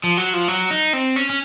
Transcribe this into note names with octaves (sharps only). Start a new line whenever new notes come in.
F3
F#3
F3
F#3
D#4
C4
C#4
C#4